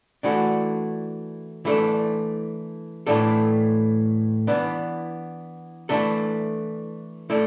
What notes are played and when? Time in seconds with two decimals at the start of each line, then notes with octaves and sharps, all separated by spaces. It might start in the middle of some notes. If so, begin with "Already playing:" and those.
0.23 E3 A3 D4 F#4
1.65 E3 A3 D4 A4
3.07 A2 E3 A3 D4 A4
4.47 E3 B3 D4
5.89 E3 A3 D4 A4
7.30 A3 E4 A4 D5